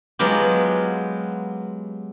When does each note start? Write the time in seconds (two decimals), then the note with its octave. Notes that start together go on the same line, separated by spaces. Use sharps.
0.19 F#3 G#3 B3 F4 G4